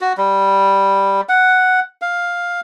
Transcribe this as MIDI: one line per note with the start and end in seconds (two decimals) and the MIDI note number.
0.01 0.13 66
0.18 1.21 55
1.29 1.80 78
2.02 2.61 77